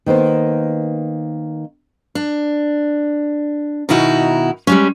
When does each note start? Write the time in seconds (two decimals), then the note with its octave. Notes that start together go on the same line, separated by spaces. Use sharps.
0.06 D#3 A#3 B3 C5
2.15 D4
3.89 B2 D#3 D#4 E4 F#4
4.67 G3 G#3 C#4